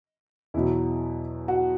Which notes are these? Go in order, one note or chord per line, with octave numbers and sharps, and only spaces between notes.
E2 B2 F#3 E4
F#4